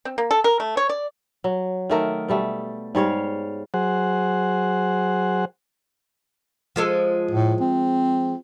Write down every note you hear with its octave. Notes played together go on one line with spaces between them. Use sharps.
C4
A#3
A4
A#4
A3
C#5
D5
F#3
D#3 A3 A#4
B2 G3 A3
G#2 G3 C#5 F5
F#3 G#4 C5 F#5
F3 G#3 A4
A2
C4